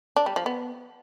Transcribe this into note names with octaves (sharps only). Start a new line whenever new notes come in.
D4
G3
F3
B3